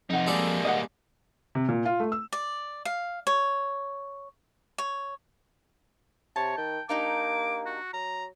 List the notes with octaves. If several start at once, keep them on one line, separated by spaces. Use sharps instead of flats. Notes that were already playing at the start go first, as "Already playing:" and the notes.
F2 C3 D#4 F#5
G3 G#3 A#3 A4 D5
D#5 F#5
C3
A#2
F4
A3
E6
D5
F5
C#5
C#5
C3 C#5 A5
D#3 G5
A#3 D4 D#4 G4 D6
F#4
F#3 A#5